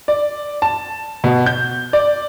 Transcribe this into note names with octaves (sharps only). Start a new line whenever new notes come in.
D5
A5
B2
G6
D5